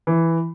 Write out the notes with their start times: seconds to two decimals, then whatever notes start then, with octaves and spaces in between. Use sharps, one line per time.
0.07 E3